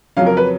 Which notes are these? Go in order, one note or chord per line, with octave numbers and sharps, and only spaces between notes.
F2 C#3 F#3 C#4 F5
A#4
B4